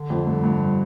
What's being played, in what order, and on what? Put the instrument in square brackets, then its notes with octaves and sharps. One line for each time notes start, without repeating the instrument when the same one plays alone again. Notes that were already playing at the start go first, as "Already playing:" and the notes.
Already playing: [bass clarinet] D3
[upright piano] F2
G2
G2